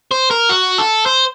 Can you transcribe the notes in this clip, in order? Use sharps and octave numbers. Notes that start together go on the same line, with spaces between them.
C5
A#4
F#4
A4
C5